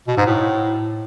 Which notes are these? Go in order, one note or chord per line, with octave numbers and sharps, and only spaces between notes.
B2
G#2
A2